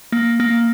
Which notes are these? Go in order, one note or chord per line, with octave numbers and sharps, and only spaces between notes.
A#3
A#3